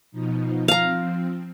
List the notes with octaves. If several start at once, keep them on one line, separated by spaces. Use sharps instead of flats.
B2 F3 D#4
F3 C4 F5 A#5